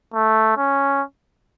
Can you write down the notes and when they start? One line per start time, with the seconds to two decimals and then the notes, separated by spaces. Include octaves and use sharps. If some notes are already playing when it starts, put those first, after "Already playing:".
0.14 A3
0.57 C#4